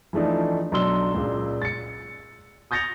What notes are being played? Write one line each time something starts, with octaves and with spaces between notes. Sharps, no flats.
E3 F3 A3 D4 D#4
B1 F#3 D4 C6 E6 G7
C#2 A#2
A6 C#7
D#6 G6 A6 A#6 C#7 F7